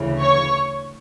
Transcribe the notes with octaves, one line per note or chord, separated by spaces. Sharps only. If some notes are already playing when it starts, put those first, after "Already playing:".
Already playing: D2 C#3 E3
C#5 C#6